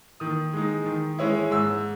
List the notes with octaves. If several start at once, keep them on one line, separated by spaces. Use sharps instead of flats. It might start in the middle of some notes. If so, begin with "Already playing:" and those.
D#3 D#6
G#3 D#4
D#3
G#3 C#4 E4
G#2 E6